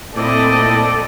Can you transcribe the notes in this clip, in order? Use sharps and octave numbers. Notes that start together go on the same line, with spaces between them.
A#2 A3 C4 E4 A4 D5 D#5